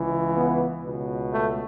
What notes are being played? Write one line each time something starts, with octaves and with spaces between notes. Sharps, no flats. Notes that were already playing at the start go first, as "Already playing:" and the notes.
Already playing: C#2 C#3 E3
B3
C#2 B2
A3